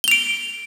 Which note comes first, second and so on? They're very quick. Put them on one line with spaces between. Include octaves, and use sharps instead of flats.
G7 F7 D7